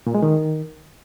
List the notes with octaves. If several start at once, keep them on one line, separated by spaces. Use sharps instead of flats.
A#2
G#3
D#3